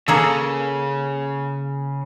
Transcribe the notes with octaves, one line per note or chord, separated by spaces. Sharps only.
C#3 A#3 G#4 A4